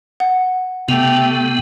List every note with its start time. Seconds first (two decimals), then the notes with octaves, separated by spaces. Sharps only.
0.20 F#5
0.89 C3 A3 B3 G4 F7